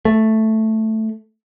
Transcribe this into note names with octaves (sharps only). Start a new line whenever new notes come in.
A3